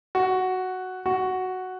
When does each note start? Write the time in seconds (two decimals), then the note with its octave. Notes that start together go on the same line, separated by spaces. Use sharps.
0.15 F#4
1.06 F#4